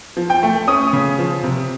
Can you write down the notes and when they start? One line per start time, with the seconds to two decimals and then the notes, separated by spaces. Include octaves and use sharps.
0.17 F3
0.30 G5
0.43 A3
0.68 C#4 D#6
0.93 C#3
1.19 F3
1.43 C3